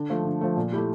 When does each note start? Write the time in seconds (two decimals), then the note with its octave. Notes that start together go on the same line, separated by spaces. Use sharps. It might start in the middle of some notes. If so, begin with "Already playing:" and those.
Already playing: D3
0.10 F3 A3
0.24 D3
0.41 F3 A3
0.57 A#2
0.72 A3 E4 G4